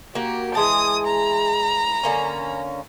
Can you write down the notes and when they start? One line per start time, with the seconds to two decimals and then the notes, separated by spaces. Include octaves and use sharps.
0.15 A#3 F#4 G4
0.55 E3 G#3 A5 D#6
1.06 A#5 B5
2.03 D3 A#3 C#4